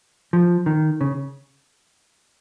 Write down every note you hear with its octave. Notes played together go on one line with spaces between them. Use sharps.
F3
D#3
C#3